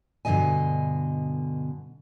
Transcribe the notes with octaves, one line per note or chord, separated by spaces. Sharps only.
G2 B2 D3 D#3 D#5 G#5